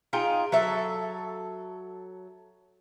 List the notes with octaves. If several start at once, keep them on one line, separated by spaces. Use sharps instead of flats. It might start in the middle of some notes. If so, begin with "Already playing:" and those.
D#4 F4 G#4 G5
F#3 A4 E5